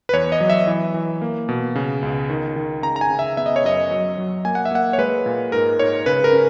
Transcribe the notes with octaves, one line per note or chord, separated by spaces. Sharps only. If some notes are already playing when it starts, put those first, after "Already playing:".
B4
E2 C#5
D#5
F#3
E5
E3
E3
A#3
B2
C#3
C#2
D#3
D#3
C#3 A#5
A#5
G#5
C#3
E5
B3 E5
D#5
C#5
F#2 D#5
F#3
F#3
A#3 G#5
F#5
E5
A#3 F#5
C#5
G#3 B4
A#2
G#2 A#4
G#2 C#5
C#3 B4
A#4
C#4